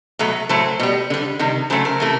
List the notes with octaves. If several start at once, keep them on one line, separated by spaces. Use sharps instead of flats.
B2 F#3 A3
A2 F#3 A3 C5
B2 G3
D3 G3
C3 D#3 G3
C#3 F#3 A3 C5
A#4
C3 E3 A3